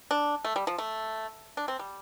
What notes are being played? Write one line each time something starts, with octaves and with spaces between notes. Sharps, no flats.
D4
A3
G3
F3
A3
D4
C4
G3